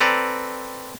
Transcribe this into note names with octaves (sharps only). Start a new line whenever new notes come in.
C4 A4 B4 D5 A#5